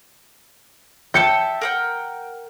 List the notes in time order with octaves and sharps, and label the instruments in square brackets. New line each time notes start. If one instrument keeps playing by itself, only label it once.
[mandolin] E5 G5 A5 [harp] G6 C#7
[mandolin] A#4 F#5 G5